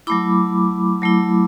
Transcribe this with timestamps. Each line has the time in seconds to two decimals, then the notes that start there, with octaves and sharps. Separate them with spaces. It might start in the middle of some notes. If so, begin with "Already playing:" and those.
0.07 F#3 A3 E4 B5 D6
1.02 F#3 A3 E4